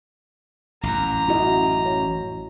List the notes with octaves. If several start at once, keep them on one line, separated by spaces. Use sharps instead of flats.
A1 F#2 A#5
E4 F#4 D#5
C#5